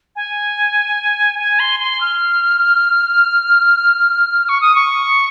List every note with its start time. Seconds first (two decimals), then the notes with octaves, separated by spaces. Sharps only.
0.15 G#5
1.38 G#5
1.59 C6
1.79 C6
2.00 F6
4.48 C#6
4.61 D#6
4.74 C#6